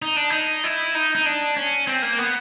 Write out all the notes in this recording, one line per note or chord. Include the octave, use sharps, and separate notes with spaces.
D#4
D4
D#4
E4
D#4
D#4
D4
C#4
C4
A#3
B3